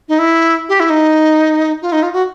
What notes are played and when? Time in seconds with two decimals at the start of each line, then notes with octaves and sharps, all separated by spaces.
0.09 D#4
0.19 E4
0.69 G4
0.80 E4
0.90 D#4
1.82 F4
1.92 D#4
2.03 F4
2.13 F#4